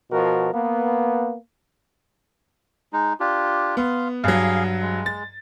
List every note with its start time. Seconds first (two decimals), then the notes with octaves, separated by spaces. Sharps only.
0.12 B2 F3 F#4 A#4
0.54 A#3 B3
2.93 G#3 D#4
3.20 D4 F4 G4
3.77 B3 F5 C6
4.24 G2 F#3 G#4 F5
4.82 G#3
5.06 A6